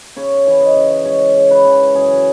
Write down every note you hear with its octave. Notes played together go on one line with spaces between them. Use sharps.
C#3 C#5
E3
D#5
C#3
G#3 C#5
C#3
B4
E3
F#2 G#4